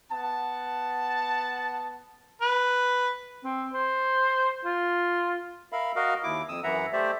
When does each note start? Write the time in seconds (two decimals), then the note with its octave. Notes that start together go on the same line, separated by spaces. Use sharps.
0.12 B3 F#5 A5
2.41 B4
3.44 C4
3.73 C5
4.65 F4
5.72 A#4 E5 F5 B5
5.96 F#4 A#4 D#5 F5
6.24 D#2 E4 D6
6.48 F2 D#6 E6
6.63 F#2 E3 E4 E5 F#5 A#5
6.93 A3 G4 C5 D5 E5